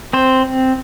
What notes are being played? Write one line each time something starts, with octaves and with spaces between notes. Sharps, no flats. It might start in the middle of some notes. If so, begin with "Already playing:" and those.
C4 C5